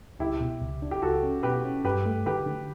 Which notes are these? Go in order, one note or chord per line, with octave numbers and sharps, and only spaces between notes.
C#2 E4 G4
B2
C#2
D4
G4
C#2 F#4 A4
C#4
B2 G4 B4
C#4
G2 G4 B4
A3
D3 G4 B4
D3